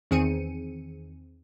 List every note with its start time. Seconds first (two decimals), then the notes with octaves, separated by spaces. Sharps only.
0.11 E2 D#3 C4 G#4 C#7 D#7